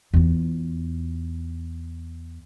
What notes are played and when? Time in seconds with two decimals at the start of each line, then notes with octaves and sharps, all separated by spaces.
0.14 E2 F4